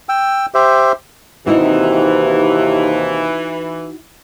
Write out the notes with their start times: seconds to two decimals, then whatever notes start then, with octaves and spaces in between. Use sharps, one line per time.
0.09 G5 E6
0.54 G4 C5 E5
1.47 D#2 C3 E3 D#4 E4 F#4 C5